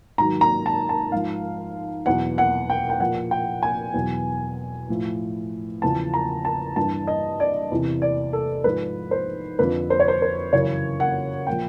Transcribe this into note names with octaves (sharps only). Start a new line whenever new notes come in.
G#2 D#3 F#3 A#5
A#5
A5
A5
G#2 F3 F5
E2 B2 F#3 F#5
F#5
G5
G5
A#2 F3 F#5
G5
G#5
E2 B2 F#3
A2 F3
E2 C#3 F3 A5
A#5
A5
G2 E3 A5
D#5
D5
E2 C3 E3
D5
A4
G#2 F3 B4
C5
F2 D3 F3 B4
C5
C#5
C5
C5
F#2 C#3 E3 C#5
F#5
A#2 F3 G5